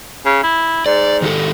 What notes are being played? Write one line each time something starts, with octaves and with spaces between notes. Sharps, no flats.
C#3
E4
G#2 D5
D#3 G4 A4